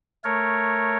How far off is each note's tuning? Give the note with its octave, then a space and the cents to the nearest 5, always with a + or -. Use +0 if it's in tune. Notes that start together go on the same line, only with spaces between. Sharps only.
A3 +0 A#4 +0 C#5 -5